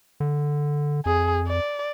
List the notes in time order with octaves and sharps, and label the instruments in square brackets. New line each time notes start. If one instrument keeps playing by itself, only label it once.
[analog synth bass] D3
[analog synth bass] F2 [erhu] G#4
[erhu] D5